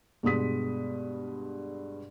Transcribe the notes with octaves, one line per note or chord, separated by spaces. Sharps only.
G2 B2 G#3 D#6 B6